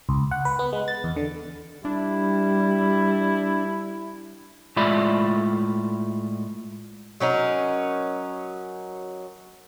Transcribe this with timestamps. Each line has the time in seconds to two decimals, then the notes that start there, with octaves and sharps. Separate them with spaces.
0.09 C#2
0.31 F#5
0.45 B4
0.59 B3
0.73 G#3
0.88 A6
1.04 E2
1.16 D3
1.85 G3 D4 E4
4.76 A2 G#3 F4 D5 E5 B5
7.20 F#3 C#4 D#4 A#4